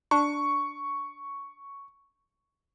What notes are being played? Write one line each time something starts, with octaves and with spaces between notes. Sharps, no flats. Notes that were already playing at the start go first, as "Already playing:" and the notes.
D4 C#6